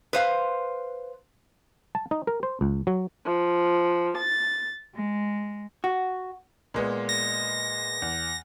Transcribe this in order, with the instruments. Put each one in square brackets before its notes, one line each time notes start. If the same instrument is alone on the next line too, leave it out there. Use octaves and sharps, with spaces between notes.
[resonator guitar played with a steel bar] B4 C5 F5
[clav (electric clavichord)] A5
D#4
A#4
C5
C#2
F#3
[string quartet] F3
A6
G#3
[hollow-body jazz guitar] F#4
[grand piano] A#2 G#3 B3
[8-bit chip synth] A#6
[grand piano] E2